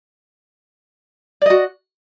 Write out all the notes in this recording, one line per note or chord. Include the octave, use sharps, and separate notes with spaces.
F#4 D5 D#5